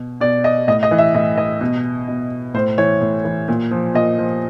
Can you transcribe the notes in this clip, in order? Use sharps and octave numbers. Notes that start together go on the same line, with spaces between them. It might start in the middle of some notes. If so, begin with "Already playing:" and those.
Already playing: B2
B2 D5
D#5
A2 D#5
D#5
E3
E5
A2 D#5
E3 D#5
B2
B2
A2 C5
E3 C#5
A2
E3
A#2
F3
A#2 D#5
F3